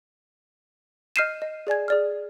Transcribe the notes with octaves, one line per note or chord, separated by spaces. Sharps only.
D#5 F6 G6 C7 D#7 E7
D#5
G#4 D5 G#5 G#6
G#4 D5 F6